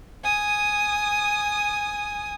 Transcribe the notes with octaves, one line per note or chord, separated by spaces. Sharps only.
G#5 D#6